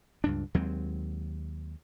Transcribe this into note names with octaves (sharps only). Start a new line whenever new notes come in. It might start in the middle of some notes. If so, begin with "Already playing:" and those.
C#2 G2 D4
D#2 F#3 G#3 C4